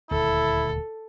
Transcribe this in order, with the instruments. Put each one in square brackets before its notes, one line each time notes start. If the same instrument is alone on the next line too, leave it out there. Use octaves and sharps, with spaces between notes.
[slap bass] D#1 D2 [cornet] E4 [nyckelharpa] A4